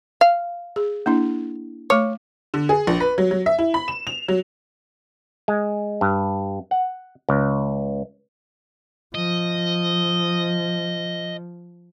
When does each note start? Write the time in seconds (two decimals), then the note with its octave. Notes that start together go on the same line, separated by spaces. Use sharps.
0.21 F5
0.76 G#4
1.06 A#3 D4 E4
1.90 A3 C#5 D6
2.54 D3
2.69 G#4
2.87 A#1
3.00 B4
3.18 F#3
3.31 F#3
3.46 E5
3.59 E4
3.74 B5
3.88 E7
4.07 F7
4.28 F#3
5.48 G#3
6.01 G2
6.71 F#5
7.29 C#2
9.15 F3 D#5